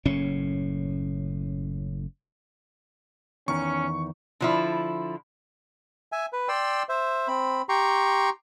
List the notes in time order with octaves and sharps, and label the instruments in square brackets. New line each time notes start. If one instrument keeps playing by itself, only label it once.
[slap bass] F#1 A2 C#4
[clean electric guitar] E2 D#3 [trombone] C#4 [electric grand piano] C#6
[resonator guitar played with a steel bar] D3 F3 E4
[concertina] E5 G#5
B4
D5 G5 C6 E6
C5 E5
C4 B5
G4 G5 A#5 C6 C#6